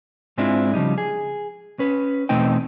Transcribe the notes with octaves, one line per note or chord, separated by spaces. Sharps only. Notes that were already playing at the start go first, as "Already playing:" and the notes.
G#2 G#3 C4 D4 E4 F4
C#3 F3 G3 D#4
G#4
C#4 B4
E2 B2 A3 C4 D#4 G5